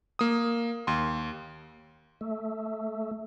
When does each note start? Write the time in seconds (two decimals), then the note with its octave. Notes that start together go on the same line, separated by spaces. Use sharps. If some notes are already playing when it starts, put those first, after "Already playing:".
0.19 A#3 D#6
0.87 D#2 C6
2.21 A3